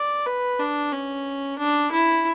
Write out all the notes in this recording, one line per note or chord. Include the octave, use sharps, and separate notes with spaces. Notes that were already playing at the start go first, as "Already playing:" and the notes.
Already playing: D5
B4
D4
C#4
D4
E4